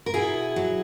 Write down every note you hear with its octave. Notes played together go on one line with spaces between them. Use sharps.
A#4
B2 E4 G#4
F#3